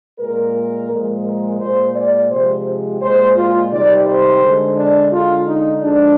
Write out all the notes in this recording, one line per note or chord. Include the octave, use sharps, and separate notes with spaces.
A#2 G#3 A#4
A#2 F3 G#3
A#4
A#2 G#3 C5
D5
C3 F3 G#3 C5
A#2 G#3 C5
F4
C3 D#3 G3 D5
C5
D3 G#3
D4
D3 G#3 F4
D#4
D3 F3 G#3 D4